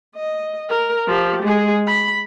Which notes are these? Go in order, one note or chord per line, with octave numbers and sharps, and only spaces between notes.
D#5
A#4
F3 G4
G#3 G#4
B5